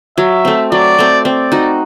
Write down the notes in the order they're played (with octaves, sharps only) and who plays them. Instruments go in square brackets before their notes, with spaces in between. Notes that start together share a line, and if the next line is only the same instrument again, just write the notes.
[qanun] F#3 [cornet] E5
[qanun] A3 C4
[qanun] F#3 [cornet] D5
[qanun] A3 C4
[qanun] C4 [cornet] D5
[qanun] D#4 F#4